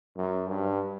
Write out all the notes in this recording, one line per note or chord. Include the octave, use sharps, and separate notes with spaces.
F#2
G2